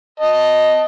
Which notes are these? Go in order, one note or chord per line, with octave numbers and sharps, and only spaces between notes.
D#5 A5